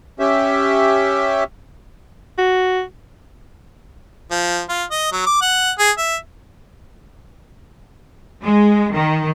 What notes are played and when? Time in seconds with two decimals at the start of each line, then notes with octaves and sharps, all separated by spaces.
0.20 C#4 G4 E5
2.38 F#4
4.31 F3
4.69 F4
4.91 D#5
5.13 F#3
5.27 D6
5.42 F#5
5.79 G#4
5.98 E5
8.42 G#3
8.93 D#3